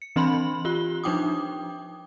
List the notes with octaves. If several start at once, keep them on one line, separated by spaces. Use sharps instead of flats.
C#7
E3 C4 D4 B5 C6 F#7
F4 G4 F#6 G7
F3 D4 D#4 G5 D6 D#6